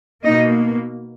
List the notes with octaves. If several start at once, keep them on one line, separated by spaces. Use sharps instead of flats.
B2 A#3 D#4 D#5